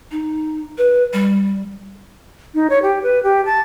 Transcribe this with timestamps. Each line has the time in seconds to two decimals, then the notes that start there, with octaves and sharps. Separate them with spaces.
0.11 D#4
0.78 B4
1.13 G3
2.55 D#4
2.70 C#5
2.83 G4
3.03 B4
3.23 G4
3.46 A5